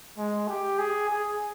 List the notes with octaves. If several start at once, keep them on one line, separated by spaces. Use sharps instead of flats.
G#3
G4
G#4
G#4